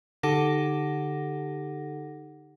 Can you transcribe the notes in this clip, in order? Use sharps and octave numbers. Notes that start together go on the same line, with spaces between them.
D3 D#4 G4 A4 F#5 A#6